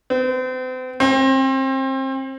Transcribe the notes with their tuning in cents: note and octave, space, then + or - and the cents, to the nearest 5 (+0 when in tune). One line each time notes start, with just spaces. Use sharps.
C4 -40
C4 +30